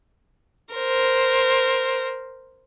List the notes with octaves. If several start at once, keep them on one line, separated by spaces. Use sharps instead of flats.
A#4 C5